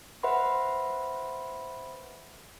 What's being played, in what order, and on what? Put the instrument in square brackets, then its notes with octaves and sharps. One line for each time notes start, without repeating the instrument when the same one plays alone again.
[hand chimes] B4 C5 E5 F#5 B5 C6